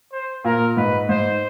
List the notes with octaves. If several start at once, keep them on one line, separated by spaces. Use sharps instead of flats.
C5
A#2 A#4
G#2 B4
G#2 C5